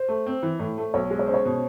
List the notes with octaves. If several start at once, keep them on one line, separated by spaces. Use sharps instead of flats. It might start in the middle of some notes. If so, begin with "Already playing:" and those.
Already playing: C5
A3
C4
E3
A2
A3
B1 C#5
G#3
C#5
C#4 C5
C#5
B2